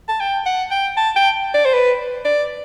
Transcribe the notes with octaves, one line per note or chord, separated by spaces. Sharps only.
A5
G5
F#5
G5
A5
G5
D5
C5
B4
D5